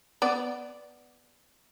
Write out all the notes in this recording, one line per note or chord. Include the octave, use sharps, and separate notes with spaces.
B3 D5